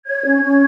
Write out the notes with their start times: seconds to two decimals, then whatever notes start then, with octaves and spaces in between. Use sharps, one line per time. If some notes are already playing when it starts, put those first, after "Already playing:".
0.06 C#5 G#6
0.24 C#4
0.42 C#4